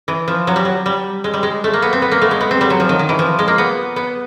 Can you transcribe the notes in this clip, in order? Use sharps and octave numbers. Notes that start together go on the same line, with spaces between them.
E3
F3
F#3
G3
F#3
G3
G#3
G3
G#3
A3
A#3
B3
C4
B3
A#3
A3
G#3
B3
C4
G3
F#3
F3
D#3
D#3
E3
F3
G#3
A#3
B3
B3